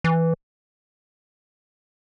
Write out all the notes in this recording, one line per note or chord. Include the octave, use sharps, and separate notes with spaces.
E3